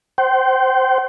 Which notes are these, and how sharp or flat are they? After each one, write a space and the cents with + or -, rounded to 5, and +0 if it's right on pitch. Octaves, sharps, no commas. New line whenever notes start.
C5 +0 G5 -35